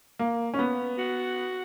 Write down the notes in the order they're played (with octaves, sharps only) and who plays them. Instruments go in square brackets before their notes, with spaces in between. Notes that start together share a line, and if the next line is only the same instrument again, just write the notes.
[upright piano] A#3
C#4
B3
[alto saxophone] F#4